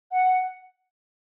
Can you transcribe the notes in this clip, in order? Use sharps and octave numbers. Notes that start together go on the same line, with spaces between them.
F#5